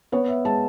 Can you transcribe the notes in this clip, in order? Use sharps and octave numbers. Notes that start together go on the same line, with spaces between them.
B3 C#5
E5
G#3 A5